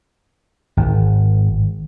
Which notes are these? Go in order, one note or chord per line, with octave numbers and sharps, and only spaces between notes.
G#1